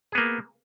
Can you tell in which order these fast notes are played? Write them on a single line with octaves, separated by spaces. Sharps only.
G#4 B3 A#3